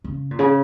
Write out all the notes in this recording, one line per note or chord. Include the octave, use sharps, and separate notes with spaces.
C#3
A#2
C#3